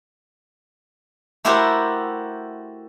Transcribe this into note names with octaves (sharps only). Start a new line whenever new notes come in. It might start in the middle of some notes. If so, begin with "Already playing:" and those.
A3 E4 F#4 G4 A#4 C5